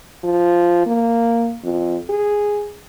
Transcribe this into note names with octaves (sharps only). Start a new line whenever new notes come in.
F3
A#3
F2
G#4